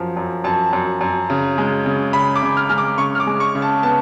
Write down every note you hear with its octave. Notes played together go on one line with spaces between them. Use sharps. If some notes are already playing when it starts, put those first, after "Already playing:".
Already playing: F#2 F3
F#2
F#2 A5
F#2
F#2
C#3
G#3
C#3
C#3 B5
D6
C#3
F6
G#3 F6
D6
C#3 C#6
F6
D6
G#3
C#6
C#3
A5
B3 A5